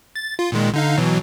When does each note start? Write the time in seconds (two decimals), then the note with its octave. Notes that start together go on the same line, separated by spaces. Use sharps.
0.16 A6
0.39 F4
0.52 A#2 D#3 G#3
0.74 D3 D#4 F5
0.98 B2 E3 F#3